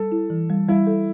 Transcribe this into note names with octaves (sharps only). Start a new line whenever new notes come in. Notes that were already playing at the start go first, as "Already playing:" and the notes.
Already playing: G3 A4
E4
E3
G3
G3 E4
A4